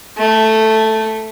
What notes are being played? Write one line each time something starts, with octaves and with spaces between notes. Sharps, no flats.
A3